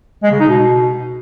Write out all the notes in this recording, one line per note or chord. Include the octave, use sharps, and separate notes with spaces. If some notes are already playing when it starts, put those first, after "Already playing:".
G#3
C#3
D#4
B2